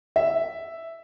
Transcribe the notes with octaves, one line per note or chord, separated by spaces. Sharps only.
E5